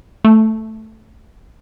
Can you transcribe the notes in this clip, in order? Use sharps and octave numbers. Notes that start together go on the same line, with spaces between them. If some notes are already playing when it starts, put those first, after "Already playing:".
A3